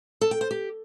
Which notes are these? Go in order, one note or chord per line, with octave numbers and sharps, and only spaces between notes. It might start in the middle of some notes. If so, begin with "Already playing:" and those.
A4
G5
C5
G4